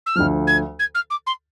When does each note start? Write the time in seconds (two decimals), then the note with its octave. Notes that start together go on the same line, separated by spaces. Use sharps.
0.06 E6
0.15 D2 D3 F3 F6
0.47 G#6
0.79 G#6
0.95 F6
1.10 D6
1.27 C6